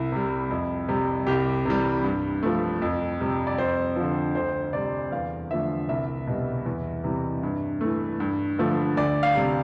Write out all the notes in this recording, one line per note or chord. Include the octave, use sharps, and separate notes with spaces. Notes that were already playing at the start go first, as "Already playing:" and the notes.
Already playing: C2 E4
C3 G3
F2
C3 G3
C2 G4
C3 E3 G3
G2
F3 A3
F2
C3 G3
D5
F2 C5
D3 F3
D2 C5
C3 G3 D5
E2 F5
D3 F3 A3 E5
C2 E5
B2 G3
E2
C3 E3 G3
G2
E3 A3
G2
D3 F3 A3
D2 D5
F5
C3 G3